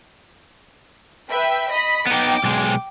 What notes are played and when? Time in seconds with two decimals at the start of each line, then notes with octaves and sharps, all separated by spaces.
1.28 B4 E5 G5
1.71 D#5 B5 B6
2.07 B3 D#4 G5 D6
2.44 B1 G#3